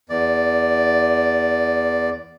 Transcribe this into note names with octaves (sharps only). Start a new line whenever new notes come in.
E2 D5